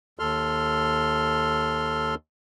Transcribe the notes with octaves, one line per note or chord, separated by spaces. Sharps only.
D#2 A4 C6 F6